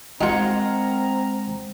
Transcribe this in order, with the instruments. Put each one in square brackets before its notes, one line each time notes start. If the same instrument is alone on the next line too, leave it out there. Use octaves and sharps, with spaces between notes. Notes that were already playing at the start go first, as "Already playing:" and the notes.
[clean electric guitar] G#3 A#4 F#5 [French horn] C4 [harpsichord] D#4 F4 [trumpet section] A#5